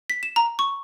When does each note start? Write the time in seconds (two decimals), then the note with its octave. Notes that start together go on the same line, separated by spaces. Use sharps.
0.10 B6
0.23 E7
0.36 A#5
0.59 C#6